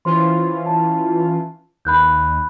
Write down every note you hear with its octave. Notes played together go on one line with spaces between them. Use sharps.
E3 C#4 F4 C5 C6
A5
D#2 B5 F#6 G6